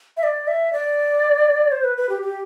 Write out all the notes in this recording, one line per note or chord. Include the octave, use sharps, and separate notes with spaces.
E5
D5
E5
D5
C5
B4
B4
G4
G4